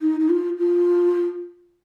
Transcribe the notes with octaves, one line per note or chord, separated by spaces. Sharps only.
D#4
D#4
F4
F4